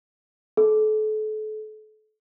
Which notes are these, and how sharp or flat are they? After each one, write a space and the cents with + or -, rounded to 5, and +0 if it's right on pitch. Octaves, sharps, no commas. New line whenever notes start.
A4 -35